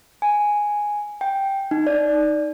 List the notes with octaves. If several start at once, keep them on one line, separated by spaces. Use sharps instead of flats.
G#5
G5
D#4
D5